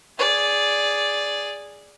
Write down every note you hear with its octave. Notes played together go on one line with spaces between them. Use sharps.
G#4 D5